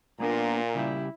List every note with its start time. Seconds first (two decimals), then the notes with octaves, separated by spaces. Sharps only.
0.20 A#2 A#3 B3 D4 F4 A#4
0.75 C#3 G3 E4 G4